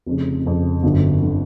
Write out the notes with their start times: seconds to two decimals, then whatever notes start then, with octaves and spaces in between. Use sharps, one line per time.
0.06 F1 F2 C#3
0.45 F1 F2 C#3
0.83 G1 F#2 D3
1.22 D3